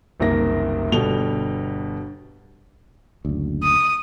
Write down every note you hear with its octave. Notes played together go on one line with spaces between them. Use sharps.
F#1 C2 D#3 A#3 A#6
G1 B2 G3 A4 F7 G7
F#1 D2
D#6